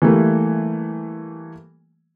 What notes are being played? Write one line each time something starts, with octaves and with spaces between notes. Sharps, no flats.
E3 G3 A3 A#3